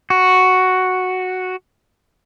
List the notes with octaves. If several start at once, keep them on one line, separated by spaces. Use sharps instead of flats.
F#4